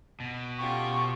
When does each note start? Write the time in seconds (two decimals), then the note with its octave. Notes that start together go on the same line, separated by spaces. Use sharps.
0.20 B2
0.58 C#4 F4 G4 A4 G5 C#6